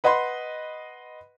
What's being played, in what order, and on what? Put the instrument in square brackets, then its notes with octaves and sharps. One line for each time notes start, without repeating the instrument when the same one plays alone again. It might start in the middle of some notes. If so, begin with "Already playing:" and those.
[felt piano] B4 D#5 F#5 B5 C6